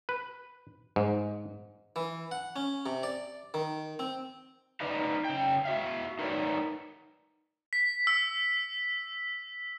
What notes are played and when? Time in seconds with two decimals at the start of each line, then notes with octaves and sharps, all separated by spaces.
0.09 B4
0.96 G#2
1.96 E3
2.31 F#5
2.56 C#4
2.86 C3
3.03 D5
3.54 D#3
3.99 C4
4.81 D#4 B4 C5 D5 D#5 F5
5.25 C#3 G5
5.65 F#4 E5 F5
6.19 D#4 A#4 B4 C#5 D5
7.73 B6
8.07 E6